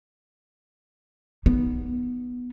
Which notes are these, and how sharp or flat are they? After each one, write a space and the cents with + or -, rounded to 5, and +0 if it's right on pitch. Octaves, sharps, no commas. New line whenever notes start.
B3 +0 D#4 -5